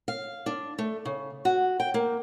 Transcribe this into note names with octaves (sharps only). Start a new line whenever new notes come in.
F5
D4
A3
C#3
F#4
G5
A#3